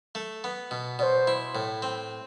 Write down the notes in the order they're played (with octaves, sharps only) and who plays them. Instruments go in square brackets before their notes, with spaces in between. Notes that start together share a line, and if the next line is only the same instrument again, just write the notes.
[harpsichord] A3
B3
B2
[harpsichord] B2 [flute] C5 D5
[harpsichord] E4
A2
C4